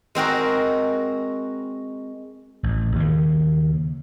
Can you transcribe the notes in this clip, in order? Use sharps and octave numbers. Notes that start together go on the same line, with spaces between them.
G#3 C4 F#4 A#4
A1
D#2 C#3